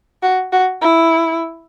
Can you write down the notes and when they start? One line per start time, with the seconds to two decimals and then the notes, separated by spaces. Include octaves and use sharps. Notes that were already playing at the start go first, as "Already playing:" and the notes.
0.23 F#4
0.52 F#4
0.82 E4